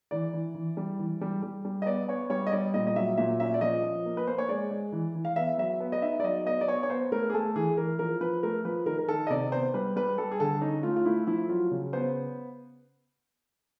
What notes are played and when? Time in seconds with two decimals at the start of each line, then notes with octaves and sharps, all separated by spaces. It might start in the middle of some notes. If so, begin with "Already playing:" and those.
0.11 E3 D5
0.34 E3
0.55 E3
0.77 G3
0.99 E3
1.21 G3
1.43 G3
1.65 G3
1.82 D#5
1.86 B3 D5
2.08 B3 C#5
2.30 G3 C#5
2.47 D#5
2.52 G3 D5
2.74 A#2 D#5
2.87 D#5
2.96 F#3 E5
3.17 A#2 E5
3.40 C#4 E5
3.54 D5
3.61 F3 D#5
3.83 F3
4.06 A#3
4.17 B4
4.27 A#3 C5
4.38 C#5
4.49 G#3 D5
4.71 G#3
4.92 E3
5.15 E3
5.25 F5
5.36 B3 E5
5.58 F#3 E5
5.80 B3
5.92 D#5
6.02 D#4 E5
6.20 D5
6.24 F#3 D#5
6.46 B3 D#5
6.61 D5
6.68 B3 C#5
6.83 C#5
6.90 B3 C5
7.12 A3 A#4
7.30 G#4
7.34 A3 A4
7.56 E3 G#4
7.77 E3 A#4
7.99 F3 A#4
8.21 F3 B4
8.43 A3 A#4
8.65 F3 B4
8.86 D#3 A#4
8.98 A#4
9.09 D#3 A4
9.27 D#5
9.30 C3 D5
9.52 B3 C5
9.74 G3 B4
9.96 G3 B4
10.18 G3 A4
10.31 G#4
10.40 D3 A4
10.61 C#4 D#4
10.83 A3 F4
10.96 F4
11.05 A3 E4
11.27 F3 E4
11.49 F#3 F4
11.71 C#3
11.93 B3 C5